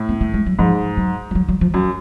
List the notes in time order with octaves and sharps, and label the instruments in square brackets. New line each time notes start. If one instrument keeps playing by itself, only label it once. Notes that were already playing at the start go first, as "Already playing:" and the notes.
Already playing: [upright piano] A2
[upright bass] B3
A3
G#3
F#3
[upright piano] G#2 [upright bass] F3
[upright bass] F#3
F3
F#3
F#3
F3
[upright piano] F#2 [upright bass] F#3